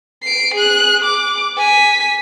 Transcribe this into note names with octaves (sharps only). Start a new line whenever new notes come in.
C7 D7
G#4 F#6
D6
G#5 B6